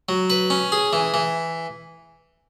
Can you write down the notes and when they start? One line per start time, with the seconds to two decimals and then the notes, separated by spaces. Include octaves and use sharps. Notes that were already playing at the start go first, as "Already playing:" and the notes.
0.09 F#3
0.30 B4
0.50 C#4
0.72 G#4
0.93 E3
1.14 E3